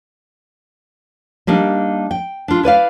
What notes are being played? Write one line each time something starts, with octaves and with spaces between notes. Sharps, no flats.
G3 A#3 D4 D#4
G5
D4 F4
E4 B4 D5 F5